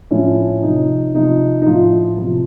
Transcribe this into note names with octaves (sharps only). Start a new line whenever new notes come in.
A2 F3 C#4
C3 F3 D#4
C3 F3 D#4
D#4
A2 F3 F4
C3 F3